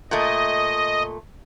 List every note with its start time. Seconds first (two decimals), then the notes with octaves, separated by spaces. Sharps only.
0.11 A#2 A3 D#5